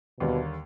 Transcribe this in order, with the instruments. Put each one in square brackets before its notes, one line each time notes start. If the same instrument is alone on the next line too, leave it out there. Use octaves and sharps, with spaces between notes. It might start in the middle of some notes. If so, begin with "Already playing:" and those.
[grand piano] D#2 D3 G3 A#3 [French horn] B2